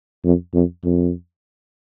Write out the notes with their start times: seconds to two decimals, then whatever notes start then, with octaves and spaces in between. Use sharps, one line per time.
0.25 F2
0.54 F2
0.85 F2